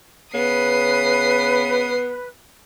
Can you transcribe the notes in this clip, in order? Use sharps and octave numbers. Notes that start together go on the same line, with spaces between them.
C#3 B3 B4 D#6 C7